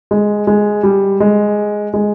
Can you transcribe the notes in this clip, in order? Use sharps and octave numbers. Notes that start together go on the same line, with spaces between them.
G#3
G#3
G3
G#3
G#3